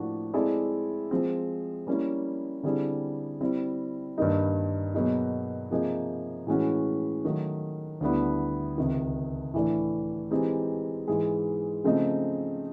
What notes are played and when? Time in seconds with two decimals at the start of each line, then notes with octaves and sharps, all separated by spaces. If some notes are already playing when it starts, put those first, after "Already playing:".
Already playing: A2 F3 A#3 D4 F#4
0.33 G#3 C4 E4 A4 D5
1.11 F3 G#3 C4
1.87 G3 A#3 C#4 E4
2.63 D3 G3 C4 E4 G#4
3.41 G3 C4 E4
4.18 G2 D#3 G3 A#3 D#4
4.94 B2 F#3 A#3 D#4 G#4
5.71 C3 F3 A#3 D#4 G#4
6.47 A2 E3 G#3 C#4 F#4
7.24 D#3 F#3 A3
8.01 D2 D3 G3 B3 E4
8.78 C#2 C3 D#3
9.54 A2 E3 A3 D4
10.31 E3 G#3 C4 D#4 G4
11.08 G#2 E3 G#3
11.84 C#3 F3 A3 C4 D#4